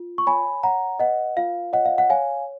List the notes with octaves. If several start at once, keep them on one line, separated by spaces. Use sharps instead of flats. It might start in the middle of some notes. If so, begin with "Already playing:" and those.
Already playing: F4
C#6
C#5 G#5 B5
C#5 F#5 A#5
B4 D#5 F#5
F4 F5
C#5 D#5 F#5
F5
F#5
C#5 F5 G#5